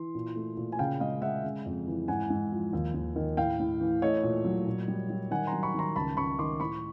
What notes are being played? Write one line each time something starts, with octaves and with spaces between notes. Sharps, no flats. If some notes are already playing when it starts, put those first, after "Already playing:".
Already playing: E3 C6
A#2
A3
A#2
G#5
C#3 F5 G5
G#3 D#5 F5
G#3 E5 F#5
C#3
F2
E3
G#2 F#5 G#5
G#2
F3
D#2
D#2
D#3
A2 F5 G5
A2
E3
A3 C#5 D#5
A#2
F#3
A#2
G3
G3
D#3 F#5 G#5
A#5 C6
F#3
B5 C#6
D#3 A#5 C6
C#2 A5 B5
C#2 B5 C#6
D#3 C6 D6
A2 B5 C#6